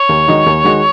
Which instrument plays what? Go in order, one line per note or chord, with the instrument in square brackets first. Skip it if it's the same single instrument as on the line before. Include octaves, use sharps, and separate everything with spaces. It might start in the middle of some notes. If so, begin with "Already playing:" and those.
Already playing: [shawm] C#5
[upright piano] D#2
D#3 G#3 D#4 F#4
D#2
D#3 G#3 D#4 F#4